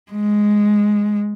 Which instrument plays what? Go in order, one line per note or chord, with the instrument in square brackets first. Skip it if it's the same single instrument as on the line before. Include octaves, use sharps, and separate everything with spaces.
[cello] G#3